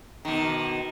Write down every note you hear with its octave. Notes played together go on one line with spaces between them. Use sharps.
B2 D#3